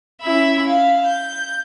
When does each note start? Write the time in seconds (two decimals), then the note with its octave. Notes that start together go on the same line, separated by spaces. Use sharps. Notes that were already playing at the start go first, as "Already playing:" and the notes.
0.22 C#4 E4 E5 B5
0.68 F5
1.07 G6